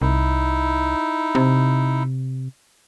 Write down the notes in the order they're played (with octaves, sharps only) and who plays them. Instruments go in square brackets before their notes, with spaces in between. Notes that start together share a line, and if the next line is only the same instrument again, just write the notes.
[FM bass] C2 [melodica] D#4 E4
[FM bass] C3